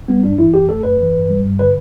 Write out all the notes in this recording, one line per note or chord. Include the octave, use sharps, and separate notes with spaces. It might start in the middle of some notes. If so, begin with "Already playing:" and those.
G3 B3
G2 D4
E3 E4
F#2 G4
A3 A4
F#2 B4
E3
G2
G3
G2
D3 B4